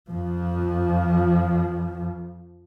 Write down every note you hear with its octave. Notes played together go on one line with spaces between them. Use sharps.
F2 F3